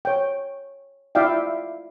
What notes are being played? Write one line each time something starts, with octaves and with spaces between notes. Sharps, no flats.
C#5 G5
E4 F4 D5 E5 F5 G5